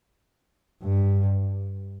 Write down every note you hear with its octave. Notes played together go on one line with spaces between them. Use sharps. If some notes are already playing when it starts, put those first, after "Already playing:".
G2